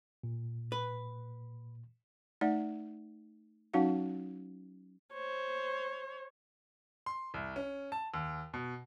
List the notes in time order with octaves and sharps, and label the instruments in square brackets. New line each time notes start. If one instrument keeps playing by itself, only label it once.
[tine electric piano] A#2
[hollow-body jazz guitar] B4
[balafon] A3 D#4 D5 F#5
F#3 C#4 D#4 F#4 F5 F#5
[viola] C5 C#5
[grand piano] C6
C2
C#4
A5
D#2
B2